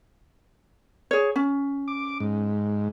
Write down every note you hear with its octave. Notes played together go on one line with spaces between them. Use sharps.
G#4 C#5
C#4
D6
G#2